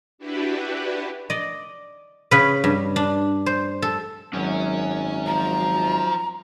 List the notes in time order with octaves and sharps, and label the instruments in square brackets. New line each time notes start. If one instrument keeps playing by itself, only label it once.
[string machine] D4 E4 F#4 G4 B4
[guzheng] D5 D#5
C#3 B4
G2
D4
C5
A4
[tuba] G#1 [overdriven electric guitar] F#2 [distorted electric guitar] C#4
[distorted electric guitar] F3 F4 [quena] A#5